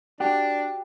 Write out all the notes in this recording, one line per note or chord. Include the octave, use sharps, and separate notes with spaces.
D4 F#4 G4